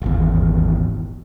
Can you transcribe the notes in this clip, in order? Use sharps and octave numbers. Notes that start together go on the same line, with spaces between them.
D#1 G#1 E2